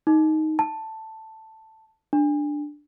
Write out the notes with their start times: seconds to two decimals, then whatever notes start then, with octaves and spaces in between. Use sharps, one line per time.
0.07 D#4
0.59 A5
2.13 D4